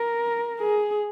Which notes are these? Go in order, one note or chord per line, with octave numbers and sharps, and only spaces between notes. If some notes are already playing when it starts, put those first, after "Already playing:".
Already playing: A#4
G#4